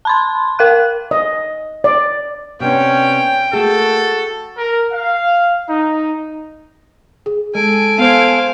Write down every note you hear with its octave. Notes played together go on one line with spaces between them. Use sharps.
A5 B5 C6
A#4 F5 F#6
D#5
D5
C3 B3 C#4 D4 G5
A3 A#3 F#4 G#4 A4
A#4
F5
D#4
G#4
G#3 A4 G#5 D7
B3 C5 F5